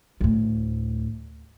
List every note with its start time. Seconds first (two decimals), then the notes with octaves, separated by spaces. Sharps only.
0.21 D2 A2